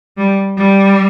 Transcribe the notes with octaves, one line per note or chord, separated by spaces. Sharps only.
G3
G3